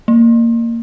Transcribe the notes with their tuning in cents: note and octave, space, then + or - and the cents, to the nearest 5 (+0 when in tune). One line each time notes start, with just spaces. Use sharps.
A#3 -15